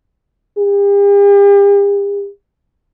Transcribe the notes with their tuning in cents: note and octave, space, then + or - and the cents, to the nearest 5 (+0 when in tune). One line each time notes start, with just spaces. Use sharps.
G4 +45